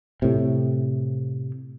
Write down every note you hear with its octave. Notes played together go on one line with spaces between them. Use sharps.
A2 C3